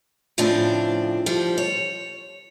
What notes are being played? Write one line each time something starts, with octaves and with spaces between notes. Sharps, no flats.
A2 C#3 F3 C4 D4
F3 G3 D4
C#5